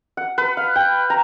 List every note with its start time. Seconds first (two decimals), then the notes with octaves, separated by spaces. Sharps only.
0.17 F#5
0.38 B4
0.57 F5
0.76 G5
1.10 A#5